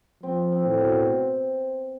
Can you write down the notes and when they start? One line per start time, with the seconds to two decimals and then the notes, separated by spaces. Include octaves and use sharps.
0.23 F3 C4
0.52 C4
0.66 A2
0.80 B2